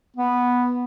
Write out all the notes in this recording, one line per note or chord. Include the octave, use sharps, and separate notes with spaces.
B3